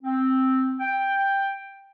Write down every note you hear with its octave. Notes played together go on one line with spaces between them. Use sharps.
C4
G5